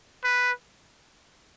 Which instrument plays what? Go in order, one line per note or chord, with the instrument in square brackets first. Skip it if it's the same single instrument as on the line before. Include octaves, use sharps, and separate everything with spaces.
[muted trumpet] B4